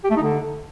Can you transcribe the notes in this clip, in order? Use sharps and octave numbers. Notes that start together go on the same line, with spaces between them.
G4
A3
D#4
D3